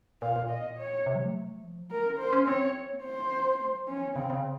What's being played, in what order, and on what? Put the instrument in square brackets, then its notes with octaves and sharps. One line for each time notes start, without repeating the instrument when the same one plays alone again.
[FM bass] A#2 [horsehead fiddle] F5
[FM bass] A#2
[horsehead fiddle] D#5
C#5
[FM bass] C3
F#3
A3
F3
F#3
[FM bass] A3 [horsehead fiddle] A#4
[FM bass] C#4
[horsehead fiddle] C5
[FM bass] C#4
[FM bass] C4 [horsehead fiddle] C#5
[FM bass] A#3
[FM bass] C4 [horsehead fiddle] C5
[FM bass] C#4
C4
A3
F#3
[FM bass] F3 [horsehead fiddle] C#4
[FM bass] D#3
[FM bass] C#3 [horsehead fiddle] C4
[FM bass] C#3